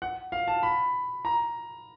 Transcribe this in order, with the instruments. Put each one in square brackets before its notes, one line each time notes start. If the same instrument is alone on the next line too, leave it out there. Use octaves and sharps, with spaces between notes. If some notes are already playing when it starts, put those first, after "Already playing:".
[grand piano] F#5
F5
A5
B5
A#5